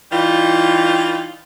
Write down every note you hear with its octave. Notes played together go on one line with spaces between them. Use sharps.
E3 G3 D#4 F4